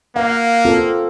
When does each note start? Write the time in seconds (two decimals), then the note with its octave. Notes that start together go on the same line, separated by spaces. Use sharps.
0.16 A#3 F5 F#5
0.65 C4 F4 A4